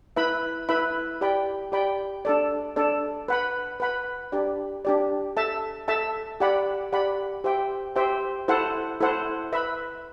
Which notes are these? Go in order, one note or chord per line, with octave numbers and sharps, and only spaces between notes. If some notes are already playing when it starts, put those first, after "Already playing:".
E4 B4 E5 B5
E4 B4 E5 B5
G4 D5 G5 B5
G4 D5 G5 B5
D4 A4 D5
D4 A4 D5
B4 F#5 B5
B4 F#5 B5
D4 G4 D5
D4 G4 D5
A4 E5 A5
A4 E5 A5
G4 D5 F#5 B5
G4 D5 F#5 B5
G4 C5 E5 G5
G4 C5 E5 G5
E4 A4 C5 F#5
E4 A4 C5 F#5
B4 E5 B5